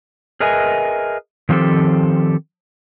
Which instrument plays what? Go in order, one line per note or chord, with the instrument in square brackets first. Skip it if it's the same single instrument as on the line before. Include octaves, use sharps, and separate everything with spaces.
[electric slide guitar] G#4 A#4 B4 D#5 E5 G#5
D#3 F3 C4 G4 A4